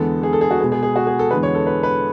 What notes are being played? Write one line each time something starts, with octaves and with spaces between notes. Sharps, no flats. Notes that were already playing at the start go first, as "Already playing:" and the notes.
Already playing: E2 D3 G#3 B3 A4
G#4
A4
G#4
F#4
B2 G#3 B3 G#4
G#4
G#4
F#4
G#4
A4
E2 D3 G#3 B3 B4
C#5
A4
B4
B4